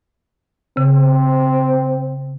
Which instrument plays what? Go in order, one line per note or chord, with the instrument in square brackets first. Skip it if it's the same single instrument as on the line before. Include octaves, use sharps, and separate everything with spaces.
[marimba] C#3 [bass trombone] C4